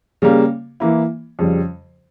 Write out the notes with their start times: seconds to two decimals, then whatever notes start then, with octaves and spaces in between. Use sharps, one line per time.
0.22 C#3 G3 A#3
0.80 E3 A#3 E4
1.39 F2 C#3 G3